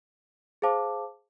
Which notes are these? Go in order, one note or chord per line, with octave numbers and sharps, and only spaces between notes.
G#4 C5 F5 A5 D6